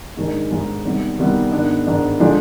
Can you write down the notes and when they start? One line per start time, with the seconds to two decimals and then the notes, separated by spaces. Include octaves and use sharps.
0.17 G#2 D#3 G#3 D4
0.50 G#2 D#3 G#3 D4
0.85 C3 D#3 G3 B3
1.18 C3 D#3 G3 B3
1.52 G#2 D#3 B3 D4
1.87 G#2 D#3 B3 D4
2.20 D3 F3 G#3 D4